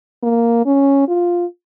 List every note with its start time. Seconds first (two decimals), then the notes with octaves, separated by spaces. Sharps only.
0.23 A#3
0.66 C#4
1.08 F4